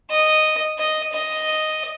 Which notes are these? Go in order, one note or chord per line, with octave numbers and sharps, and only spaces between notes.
D#5
D#5
D#5